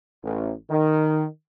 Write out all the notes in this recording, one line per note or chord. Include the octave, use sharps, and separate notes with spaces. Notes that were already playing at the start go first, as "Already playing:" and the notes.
A1
D#3